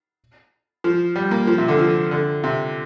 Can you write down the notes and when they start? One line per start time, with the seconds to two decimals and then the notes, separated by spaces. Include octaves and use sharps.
0.84 F3
1.16 G3
1.31 A#3
1.47 F3
1.58 C3
1.68 D3
1.79 F3
2.11 D3
2.44 C3